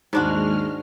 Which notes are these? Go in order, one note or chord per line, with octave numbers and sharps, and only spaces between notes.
D#2 G#2 G#3 D4 F#4 F6